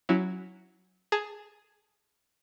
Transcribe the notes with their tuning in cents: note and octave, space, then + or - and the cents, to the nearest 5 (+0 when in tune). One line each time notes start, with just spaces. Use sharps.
F#3 +0 C#4 +0 E4 +0
G#4 +5 A5 +10